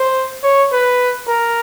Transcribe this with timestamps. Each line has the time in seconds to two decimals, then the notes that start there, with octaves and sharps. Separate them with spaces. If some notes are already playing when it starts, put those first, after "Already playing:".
Already playing: C5
0.43 C#5
0.72 B4
1.27 A#4